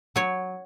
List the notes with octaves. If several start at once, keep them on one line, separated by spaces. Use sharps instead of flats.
F#3 C#5